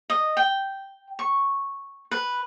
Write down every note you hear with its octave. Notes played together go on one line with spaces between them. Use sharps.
D#5
G5
C#6
B4